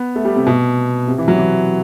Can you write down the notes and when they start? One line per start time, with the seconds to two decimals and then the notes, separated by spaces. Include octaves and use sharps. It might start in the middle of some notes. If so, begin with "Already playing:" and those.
Already playing: B3
0.16 A3
0.25 G3
0.36 C3
0.47 B2
1.07 C3
1.18 E3
1.28 F#3
1.38 E3